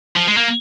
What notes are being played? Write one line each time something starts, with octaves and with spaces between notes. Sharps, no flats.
F3
G#3
A#3